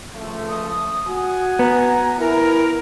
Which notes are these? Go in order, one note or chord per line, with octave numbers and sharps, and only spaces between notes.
C#2 F3 A3
D#6
F#4 F#5 G#5
B3 A#5
E4 A#4